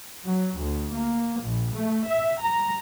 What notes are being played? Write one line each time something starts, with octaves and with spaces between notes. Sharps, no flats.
F#3
D2
A#3
A#1
A3
E5
A#5